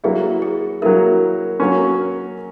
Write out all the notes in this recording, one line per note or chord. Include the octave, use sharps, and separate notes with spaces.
F#3 A#3 E4 G#4
G#4
F#3 A#3 E4 A#4
F#3 A#3 C#4